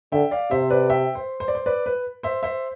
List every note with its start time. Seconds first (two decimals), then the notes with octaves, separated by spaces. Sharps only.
0.12 D3 E5 G5
0.31 D5 F5
0.51 C3 C5 E5
0.70 B4 D5
0.90 E5 G5
1.15 C5
1.40 C5
1.48 D5
1.55 C5
1.66 B4 D5
1.86 B4
2.23 C5 E5
2.43 C5 E5